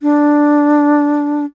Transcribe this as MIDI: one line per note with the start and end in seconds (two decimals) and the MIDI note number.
0.02 1.45 62